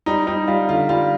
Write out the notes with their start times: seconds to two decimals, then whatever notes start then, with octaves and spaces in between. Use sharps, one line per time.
0.06 G3 D#4
0.27 G3 D#4
0.47 G3 F4
0.69 D3 F4
0.89 G3 F4